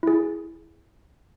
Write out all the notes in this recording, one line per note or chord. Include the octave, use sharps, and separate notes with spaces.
E4 G#4